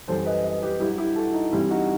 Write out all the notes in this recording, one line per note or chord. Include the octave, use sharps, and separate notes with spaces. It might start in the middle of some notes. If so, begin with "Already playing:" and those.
F#2 E3 G3 A4 C5
B4 D#5
B4 D#5
G4 B4
G2 F#3 E4 G4
E4 G4
F#4 A4
D#4
G2 E3 G3 C4 E4
D#4 F#4